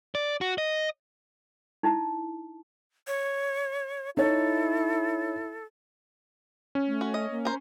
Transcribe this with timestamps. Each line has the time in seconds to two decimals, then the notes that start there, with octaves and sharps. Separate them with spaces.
0.15 D5
0.41 F#4
0.58 D#5
1.83 D#4 E4 A5
3.07 C#5
4.17 D#4 E4 A4 C#5
6.75 C#4
6.87 A3
7.01 F#4
7.14 D#5
7.31 A#3
7.45 A#4 C5